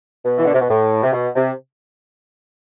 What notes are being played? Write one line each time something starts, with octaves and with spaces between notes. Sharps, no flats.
B2
E3
D3
C3
B2
A2
C3
B2
C3